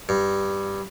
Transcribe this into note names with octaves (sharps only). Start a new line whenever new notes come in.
G2